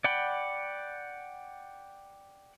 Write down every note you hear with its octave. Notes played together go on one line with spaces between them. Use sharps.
D5 F#5 G5 B5